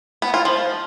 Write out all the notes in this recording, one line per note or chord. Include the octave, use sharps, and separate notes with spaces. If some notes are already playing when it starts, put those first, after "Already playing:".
B3
F4
F3